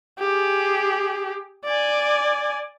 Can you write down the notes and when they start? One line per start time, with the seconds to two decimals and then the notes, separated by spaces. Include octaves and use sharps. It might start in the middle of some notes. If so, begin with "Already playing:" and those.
0.19 G4 G#4
1.65 D5 G#5